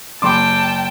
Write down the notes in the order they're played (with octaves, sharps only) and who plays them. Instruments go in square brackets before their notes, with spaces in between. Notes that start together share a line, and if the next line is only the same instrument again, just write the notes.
[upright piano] F#1 C6 D6 [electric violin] G5 A5